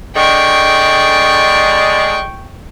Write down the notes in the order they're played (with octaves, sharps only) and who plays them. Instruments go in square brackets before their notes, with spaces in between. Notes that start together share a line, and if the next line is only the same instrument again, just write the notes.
[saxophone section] D3 G#3 [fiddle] G5 C#6